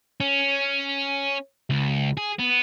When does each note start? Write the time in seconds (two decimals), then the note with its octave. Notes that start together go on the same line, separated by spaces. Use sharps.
0.20 C#4
1.70 C#2
2.17 G#4
2.39 B3